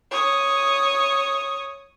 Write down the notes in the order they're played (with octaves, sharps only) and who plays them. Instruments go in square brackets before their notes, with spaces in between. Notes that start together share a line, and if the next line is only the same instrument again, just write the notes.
[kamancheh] C#5 D#6